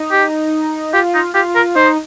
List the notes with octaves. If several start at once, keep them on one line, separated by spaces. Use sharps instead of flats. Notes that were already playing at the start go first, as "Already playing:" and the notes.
Already playing: D#4
G4
F4 G4
D#4
F4 G4
A#4
D#4 C5